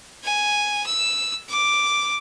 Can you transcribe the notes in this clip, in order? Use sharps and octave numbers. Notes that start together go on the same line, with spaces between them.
G#5
E6
D6